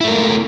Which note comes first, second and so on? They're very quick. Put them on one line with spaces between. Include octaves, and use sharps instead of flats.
E4 A3 A#4 A#3